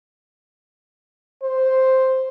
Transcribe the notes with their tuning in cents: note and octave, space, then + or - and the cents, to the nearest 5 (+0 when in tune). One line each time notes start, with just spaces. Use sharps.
C5 +0